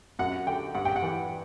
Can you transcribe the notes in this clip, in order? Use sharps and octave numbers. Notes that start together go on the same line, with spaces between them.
F#2 F#5
D3 G5
G2 F#5
G5
F#5
E3